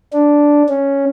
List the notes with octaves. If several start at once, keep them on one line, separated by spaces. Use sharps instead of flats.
D4
C#4